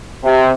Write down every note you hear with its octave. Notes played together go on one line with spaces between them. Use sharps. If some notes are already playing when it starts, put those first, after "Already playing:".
C3